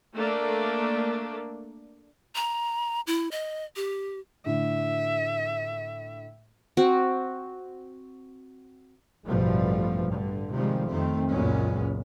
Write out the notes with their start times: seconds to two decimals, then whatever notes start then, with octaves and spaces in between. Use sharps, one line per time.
0.13 A3 A#3 D4
2.35 A#5
3.07 E4
3.31 D#5
3.76 G4
4.46 A2 D3 E5
6.77 C4 F#4
9.25 A1 G2 B2 F3 G3 A3
10.06 G2 D3
10.50 C3 D#3 F3 G3 G#3 C4
10.86 F2 D#3 A3 C4
11.30 C#2 F#2 A#2 G#3 B3 C#4